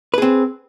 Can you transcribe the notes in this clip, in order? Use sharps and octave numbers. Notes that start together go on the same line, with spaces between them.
C4 G#4 B4